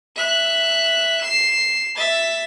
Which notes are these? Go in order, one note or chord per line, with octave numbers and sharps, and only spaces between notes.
E5 F#6
C7 E7
E5 A6